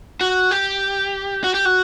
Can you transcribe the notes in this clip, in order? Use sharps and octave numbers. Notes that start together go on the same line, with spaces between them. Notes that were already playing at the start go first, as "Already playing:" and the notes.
F#4
G4
F#4
G4
F#4